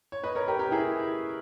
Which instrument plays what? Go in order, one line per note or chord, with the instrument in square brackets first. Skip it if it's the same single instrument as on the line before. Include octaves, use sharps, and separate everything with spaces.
[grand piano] C#5
B4 D#5
A#4 C#5
G4 A#4
G4 A#4
E4 G#4